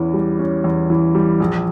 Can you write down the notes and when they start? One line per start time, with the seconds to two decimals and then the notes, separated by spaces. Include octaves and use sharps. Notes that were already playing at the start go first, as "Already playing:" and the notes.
Already playing: E2 E3 C#4
0.14 G3
0.39 C#4
0.64 E2
0.90 E3
1.15 G3
1.40 A#1